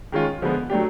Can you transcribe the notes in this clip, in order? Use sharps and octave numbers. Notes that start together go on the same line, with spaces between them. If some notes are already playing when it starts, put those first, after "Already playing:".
D#3 G#3 C#4 F4
D3 F3 G#3 B3
F#3 A3 D4 G4